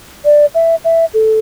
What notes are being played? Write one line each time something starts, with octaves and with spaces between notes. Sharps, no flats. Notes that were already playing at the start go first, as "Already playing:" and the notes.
D5
E5
E5
A4